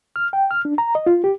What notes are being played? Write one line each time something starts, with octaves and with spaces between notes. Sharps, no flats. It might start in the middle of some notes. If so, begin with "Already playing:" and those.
F6
G5
F6
D4
A#5
D#5
F4
G4